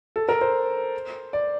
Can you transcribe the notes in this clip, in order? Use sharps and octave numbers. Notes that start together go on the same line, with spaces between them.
A4
A#4
C5
D5